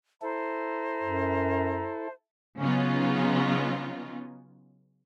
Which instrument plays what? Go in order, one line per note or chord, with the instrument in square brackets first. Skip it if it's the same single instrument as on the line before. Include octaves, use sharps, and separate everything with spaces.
[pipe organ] E4 A4 [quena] C5 [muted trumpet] A#5
[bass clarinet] F#2
[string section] C#3 F#3 B3 C#4 D#4 F4